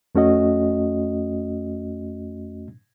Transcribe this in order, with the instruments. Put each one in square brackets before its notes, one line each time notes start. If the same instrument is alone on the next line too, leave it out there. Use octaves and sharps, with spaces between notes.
[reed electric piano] F2 A3 C#4 F#4 D#5